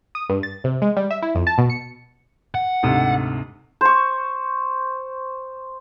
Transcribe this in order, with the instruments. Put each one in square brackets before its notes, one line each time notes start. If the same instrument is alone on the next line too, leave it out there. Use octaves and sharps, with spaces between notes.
[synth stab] D#6
G2
A6
C3
G#3
G3
E5
E4
F2
A5
B2
C#7
[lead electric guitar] F#5
[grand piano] D2 G#2 C3
[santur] C5 C#6